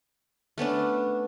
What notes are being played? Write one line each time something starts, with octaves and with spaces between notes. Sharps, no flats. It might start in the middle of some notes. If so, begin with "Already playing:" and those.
A3 B3 C#4 D4